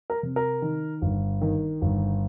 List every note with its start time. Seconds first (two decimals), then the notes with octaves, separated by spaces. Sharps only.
0.10 A#4
0.23 C3
0.36 A#4
0.62 D#3
1.02 G1
1.41 D#3
1.82 G1